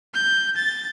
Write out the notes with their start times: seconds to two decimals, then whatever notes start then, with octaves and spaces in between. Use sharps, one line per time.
0.14 G6
0.56 A6